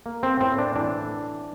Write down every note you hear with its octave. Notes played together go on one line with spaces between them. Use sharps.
A#3
C4
A2 C4
D4
E3 D4